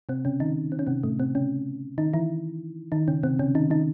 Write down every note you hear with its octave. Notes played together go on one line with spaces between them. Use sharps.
C3 C4
C#3 C#4
D#3 D#4
C4
C#4
C3 C4
A2 A3
C3 C4
C#3 C#4
D#3 D#4
E3 E4
D#3 D#4
C#3 C#4
C3 C4
C#3 C#4
D#3 D#4
D#3 D#4